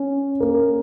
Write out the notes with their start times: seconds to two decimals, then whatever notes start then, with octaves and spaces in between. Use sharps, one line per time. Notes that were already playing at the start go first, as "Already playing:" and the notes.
Already playing: C#4
0.40 A#3